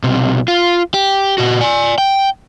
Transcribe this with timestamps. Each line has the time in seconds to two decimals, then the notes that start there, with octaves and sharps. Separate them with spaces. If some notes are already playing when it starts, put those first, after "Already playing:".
0.03 B1 C3
0.48 F4
0.94 G4
1.38 A#2 F#4
1.61 D5 G#5
1.98 G5